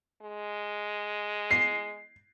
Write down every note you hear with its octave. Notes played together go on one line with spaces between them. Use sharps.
G#3
C7